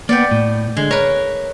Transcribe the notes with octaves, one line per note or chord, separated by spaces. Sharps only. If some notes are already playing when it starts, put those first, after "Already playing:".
A#3 B3 D5 G5
A2
D3 G#3
A#4 B4 C#5